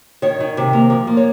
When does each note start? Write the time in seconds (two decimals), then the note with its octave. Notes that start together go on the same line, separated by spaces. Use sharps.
0.22 D#3 C#5
0.40 D#3
0.57 C3
0.73 A#3
0.90 F3
1.07 A#3
1.17 C#5